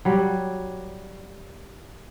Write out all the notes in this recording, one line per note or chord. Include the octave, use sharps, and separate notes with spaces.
F#3 G3